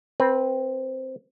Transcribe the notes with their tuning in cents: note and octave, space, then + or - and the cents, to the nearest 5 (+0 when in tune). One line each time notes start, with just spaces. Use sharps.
C4 +0 B4 -20